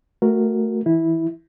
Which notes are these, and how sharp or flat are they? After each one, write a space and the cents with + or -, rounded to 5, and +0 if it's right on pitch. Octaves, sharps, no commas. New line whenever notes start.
A3 +15 F#4 +0 A#4 +0
E3 -10 E4 -10